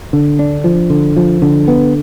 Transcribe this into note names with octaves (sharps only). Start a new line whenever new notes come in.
D3
D4
F3
D3
F3
D3
B3